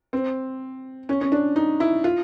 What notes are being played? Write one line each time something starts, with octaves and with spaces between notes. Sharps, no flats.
C4
C#4
C#4
D4
D#4
E4
F4